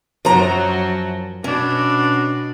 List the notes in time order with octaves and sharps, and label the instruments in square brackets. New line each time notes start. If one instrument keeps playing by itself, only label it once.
[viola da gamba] F#2 F#3 [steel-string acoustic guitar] F3 A#5
[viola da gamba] B2 D4 [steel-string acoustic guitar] C#4